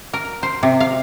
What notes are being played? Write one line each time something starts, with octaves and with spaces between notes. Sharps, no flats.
A#4
C5
C3
F5